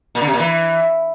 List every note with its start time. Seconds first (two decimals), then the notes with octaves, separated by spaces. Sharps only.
0.15 A#2
0.21 D3
0.27 C3
0.33 A#2
0.40 E3